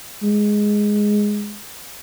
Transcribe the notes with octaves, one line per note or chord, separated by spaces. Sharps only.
G#3